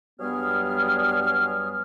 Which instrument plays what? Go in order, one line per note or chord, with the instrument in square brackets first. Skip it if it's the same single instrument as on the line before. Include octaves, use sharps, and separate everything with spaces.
[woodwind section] G2 F#3 G3 B3 G#4 F6